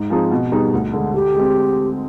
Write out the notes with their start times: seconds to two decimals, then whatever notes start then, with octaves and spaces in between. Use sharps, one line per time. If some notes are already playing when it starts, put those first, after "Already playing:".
Already playing: G#2
0.10 F3 C4 D#4 G#4
0.31 B2
0.52 G3 B3 D#4 G#4
0.73 D2
0.93 D3 G#3
1.14 D3 G4
1.35 G#3 C4